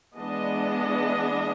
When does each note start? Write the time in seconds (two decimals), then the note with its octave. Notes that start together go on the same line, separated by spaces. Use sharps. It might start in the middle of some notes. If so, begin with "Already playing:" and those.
0.17 E3 G#3 B3 D4 D#5